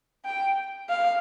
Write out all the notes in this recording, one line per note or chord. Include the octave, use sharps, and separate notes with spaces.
G5
F5